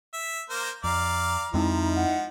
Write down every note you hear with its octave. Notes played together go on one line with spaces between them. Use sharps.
E5
A#3 A#4 C5
F2 D5 F5 A#5
F2 F3 G#3 C4 D#4 E4
F#5